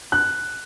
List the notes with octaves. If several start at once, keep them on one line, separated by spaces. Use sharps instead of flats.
F#6